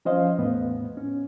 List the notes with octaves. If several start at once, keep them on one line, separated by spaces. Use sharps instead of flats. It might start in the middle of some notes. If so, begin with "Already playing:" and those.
F3 C#4 C5 D#5 F5
E2 A2 B3
C#4